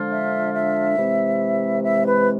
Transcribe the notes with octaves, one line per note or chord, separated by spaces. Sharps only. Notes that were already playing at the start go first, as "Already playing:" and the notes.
Already playing: D3 F3 G#3 D4 F4
E5
E5
C3 E3 G#3 C4
E5
B4